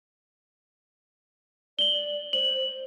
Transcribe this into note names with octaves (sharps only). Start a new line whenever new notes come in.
D5 F#7 G7
C5 F#7